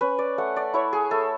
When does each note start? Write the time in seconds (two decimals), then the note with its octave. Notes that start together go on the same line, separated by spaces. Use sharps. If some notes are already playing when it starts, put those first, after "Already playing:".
0.01 C#4 B4
0.19 D5
0.38 A3 F#5
0.56 D5
0.74 E4 C#5
0.93 G#4
1.11 A3 A4